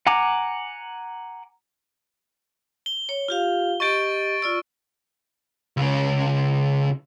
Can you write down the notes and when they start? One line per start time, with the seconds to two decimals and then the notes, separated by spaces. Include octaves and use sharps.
0.07 F#5 G#5 A#5 D6
2.86 G7
3.09 C#5
3.28 F4 G4 F5
3.80 G4 D#5 C#6 A6 D7
4.42 F4 D5 E6
5.77 C#2 C#3